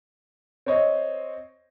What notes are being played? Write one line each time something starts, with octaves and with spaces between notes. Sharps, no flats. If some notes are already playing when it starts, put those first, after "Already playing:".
C4 C5 C#5 D#5